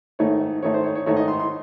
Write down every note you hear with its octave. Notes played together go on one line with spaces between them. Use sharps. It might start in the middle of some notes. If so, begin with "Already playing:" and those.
G#2 D#3 A3 D#4 C#5
G#2 D#3 A3 D#4 C#5
C5
C#5
C#5
G#2 D#3 A3 D#4 C#5
D#5
C6
C6